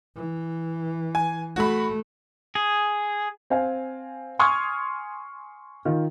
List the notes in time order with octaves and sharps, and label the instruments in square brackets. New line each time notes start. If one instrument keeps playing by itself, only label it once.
[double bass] E3
[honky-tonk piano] G#5
[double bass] A3 [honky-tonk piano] F#4 B5
[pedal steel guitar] G#4
[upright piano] C4 F5 G#5
G#5 C6 C#6 D#6 F6 G#6
D#3 F4